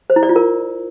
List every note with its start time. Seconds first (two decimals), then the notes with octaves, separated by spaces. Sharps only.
0.10 C5
0.16 E4
0.23 D5
0.29 F4
0.36 A#4